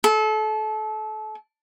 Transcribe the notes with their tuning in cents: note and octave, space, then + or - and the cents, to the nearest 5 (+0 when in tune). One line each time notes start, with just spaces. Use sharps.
A4 -30